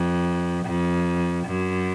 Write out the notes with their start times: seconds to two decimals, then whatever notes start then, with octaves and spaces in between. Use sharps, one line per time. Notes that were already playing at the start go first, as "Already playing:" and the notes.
Already playing: F2
0.66 F2
1.47 F#2